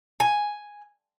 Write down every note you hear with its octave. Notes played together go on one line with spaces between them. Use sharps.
G#5